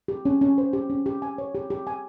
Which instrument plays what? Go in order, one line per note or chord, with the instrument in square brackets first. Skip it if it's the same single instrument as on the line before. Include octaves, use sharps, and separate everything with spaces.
[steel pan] G4
C#4
C#4
C5
G4
C#4
G4
G#5
C#5
G4
G4
G#5